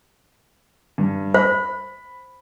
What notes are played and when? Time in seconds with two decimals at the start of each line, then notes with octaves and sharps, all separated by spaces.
0.98 G2
1.34 C5 B5